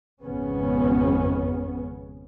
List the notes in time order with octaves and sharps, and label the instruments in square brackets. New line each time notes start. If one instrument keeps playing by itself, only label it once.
[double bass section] G#1 F2 C#3 B3 C#4